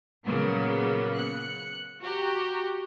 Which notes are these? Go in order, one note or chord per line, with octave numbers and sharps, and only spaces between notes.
A#2 C#3 F#3 A#3 B3
F#6 C#7
F#4 G4 A#5